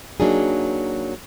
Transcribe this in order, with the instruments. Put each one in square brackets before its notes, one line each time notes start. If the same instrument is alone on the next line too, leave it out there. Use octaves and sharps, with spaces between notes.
[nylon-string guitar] F#3 A#3 D4 D#4 G#4